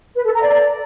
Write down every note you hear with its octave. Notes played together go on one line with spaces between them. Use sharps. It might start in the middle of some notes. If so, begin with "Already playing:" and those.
B4
A4
A#5
D5